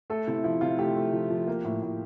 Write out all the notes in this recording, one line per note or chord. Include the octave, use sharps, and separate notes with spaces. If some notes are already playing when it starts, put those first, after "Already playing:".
A3 A4
C3 E4
F3 E4
C3 F4
A3 G4
A3
F3
F3
A#3
A2
A2